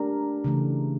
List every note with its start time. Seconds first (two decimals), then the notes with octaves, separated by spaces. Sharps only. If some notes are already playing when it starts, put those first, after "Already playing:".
Already playing: A3 D4 G4 A#4
0.44 C#3 E3 A3